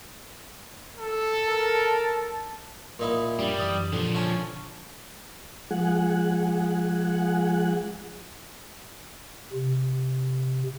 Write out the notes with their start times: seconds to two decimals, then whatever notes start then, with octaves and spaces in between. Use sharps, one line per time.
0.98 A4
1.47 A#4 A5
2.99 A#2 D#4 E4
3.39 F#2 G3 D4
3.60 F#2 E3 F#3 D#6
3.92 D3 F3 A4
4.15 C#4 G#5 A5
5.71 F3 G#3 G#4 F#5
9.53 C3